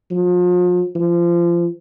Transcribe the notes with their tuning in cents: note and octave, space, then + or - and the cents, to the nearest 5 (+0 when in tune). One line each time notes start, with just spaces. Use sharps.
F3 +40
F3 -25